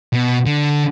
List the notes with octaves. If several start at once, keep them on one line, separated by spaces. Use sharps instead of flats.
B2
D3